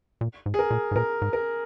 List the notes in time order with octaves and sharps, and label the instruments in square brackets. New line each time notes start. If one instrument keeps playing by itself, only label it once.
[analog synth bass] A#2
G#2
[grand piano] G#4
A#4
[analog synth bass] A#2
G#2
[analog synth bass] A#2 [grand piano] A#4
[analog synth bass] G#2
[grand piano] A#4